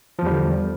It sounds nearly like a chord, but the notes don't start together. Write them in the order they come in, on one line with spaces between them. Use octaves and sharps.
F3 E2 G3 D3